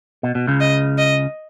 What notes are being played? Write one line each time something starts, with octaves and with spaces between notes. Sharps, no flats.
B2
B2
C#2 C#3
D#5
D#5